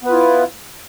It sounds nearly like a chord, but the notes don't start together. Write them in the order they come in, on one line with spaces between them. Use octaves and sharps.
B3 B4 F4 E4